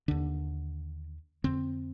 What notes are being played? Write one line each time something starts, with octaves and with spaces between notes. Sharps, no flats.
D#2 D3 D4
F2 D3 C4